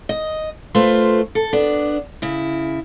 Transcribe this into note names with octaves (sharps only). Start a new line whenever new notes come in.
D#5
A3 F4 B4 C5
A4
B3 D4
C#3 E4